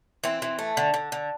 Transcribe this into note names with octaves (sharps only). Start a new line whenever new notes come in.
E3 C4
E3
A3
D3
D3
D3